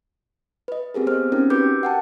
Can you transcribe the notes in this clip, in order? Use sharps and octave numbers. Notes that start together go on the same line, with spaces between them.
B4 D#5
C4 G4 G#4 A#4
B3 A#4 C5 F6
C4 C#4 D#4 A#4
F#4 G4 A#4 B4 D6 G6
F#5 G5 A5